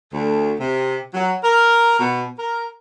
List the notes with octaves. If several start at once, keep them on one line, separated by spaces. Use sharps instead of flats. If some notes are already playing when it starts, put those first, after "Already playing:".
D2
C3
F#3
A#4
B2
A#4